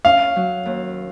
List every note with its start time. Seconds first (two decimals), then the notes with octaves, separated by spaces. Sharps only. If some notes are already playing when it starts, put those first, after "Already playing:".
0.05 C#4 F5
0.36 F#3
0.65 D#2